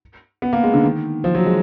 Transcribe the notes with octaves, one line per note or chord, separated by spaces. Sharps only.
B3
A#3
G#3
D3
D#3
F3
F#3
G#3